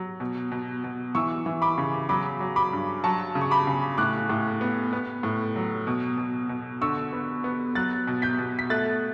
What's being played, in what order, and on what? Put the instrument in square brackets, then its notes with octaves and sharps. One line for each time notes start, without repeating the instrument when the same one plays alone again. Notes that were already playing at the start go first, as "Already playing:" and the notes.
Already playing: [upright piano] F#3
B2
B2
B2
E3 C#6 E6
E3
B5 D6
C#3
F#3 B5 D6
F#3
B5 D6
G2
F#3 A5 C#6
C#3
C#6
B5 D6
C#3
A2 D6 F#6
A2
B3
B3
A2
F#3
B2
B2
B2
D3 C#6 E6
B3
B3
F#3 F#6 A6
B2
G6 B6
B2
B6
A3 F#6 A6